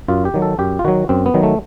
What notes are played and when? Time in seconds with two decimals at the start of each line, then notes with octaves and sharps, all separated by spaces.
0.08 F#2 F4
0.25 G4
0.34 D#3 F#3
0.42 A4
0.59 F#2 G4
0.79 F4
0.85 D#3 F#3 F#4
1.09 F#2 C4
1.26 B3
1.34 D#3 F#3
1.43 A3